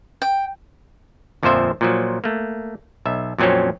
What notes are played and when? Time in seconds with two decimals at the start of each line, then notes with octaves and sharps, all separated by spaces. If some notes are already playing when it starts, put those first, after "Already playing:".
0.22 G5
1.43 G1 F2 A#2 F3 C5 E5
1.81 A#2 F3 F#3
2.24 A3 A#3
3.06 B1 E5
3.38 F2 A#2 F#3 C4 C#4